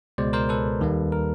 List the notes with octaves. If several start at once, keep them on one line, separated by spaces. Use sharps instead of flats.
C#2 B2 G#3 C5 D5
A#4 C5
A4 B4
D#2 D#3 G3 A#3
A#4